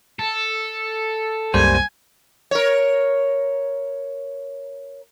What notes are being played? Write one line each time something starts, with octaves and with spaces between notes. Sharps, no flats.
A4
C2 F#2 G3 G#3 A#3 C5 G#5
A#4 C#5